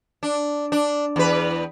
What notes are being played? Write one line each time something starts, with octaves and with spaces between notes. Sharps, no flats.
D4
D4
E2 B4